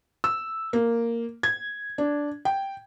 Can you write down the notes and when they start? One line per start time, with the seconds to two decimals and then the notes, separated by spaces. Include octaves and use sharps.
0.24 E6
0.73 A#3
1.43 G#6
1.98 D4
2.45 G5